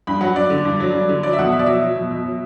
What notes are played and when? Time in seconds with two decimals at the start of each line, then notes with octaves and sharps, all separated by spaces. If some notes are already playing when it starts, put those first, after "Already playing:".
0.07 G2 B5
0.21 F#3 F#5
0.36 G2 D5
0.50 D3
0.65 G2
0.80 F#3
0.94 G2
1.09 D3
1.23 F#3 D5
1.33 E5
1.39 B2 F#5
1.52 B2 E5
1.59 D5
1.66 F#3 E5
1.81 F#3
1.96 B2
2.11 B2
2.25 F#3